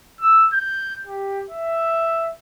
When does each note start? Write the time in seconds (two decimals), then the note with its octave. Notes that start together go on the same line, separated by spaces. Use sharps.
0.21 E6
0.53 G6
1.07 G4
1.50 E5